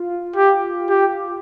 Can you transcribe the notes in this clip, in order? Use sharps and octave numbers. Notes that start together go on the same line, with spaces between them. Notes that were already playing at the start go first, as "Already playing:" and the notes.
Already playing: F4
G4
G4